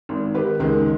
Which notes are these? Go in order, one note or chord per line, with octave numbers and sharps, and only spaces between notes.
G#1
D#3 G4 B4
C#2 D#3 G#3